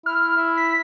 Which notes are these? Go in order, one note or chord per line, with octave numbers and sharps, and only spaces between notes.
E4 F6
E4
B6